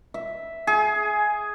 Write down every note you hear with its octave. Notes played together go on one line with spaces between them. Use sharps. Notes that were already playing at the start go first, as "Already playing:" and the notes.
E5
G#4